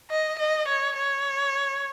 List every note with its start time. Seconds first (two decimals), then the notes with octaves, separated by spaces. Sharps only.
0.11 D#5
0.39 D#5
0.68 C#5
0.96 C#5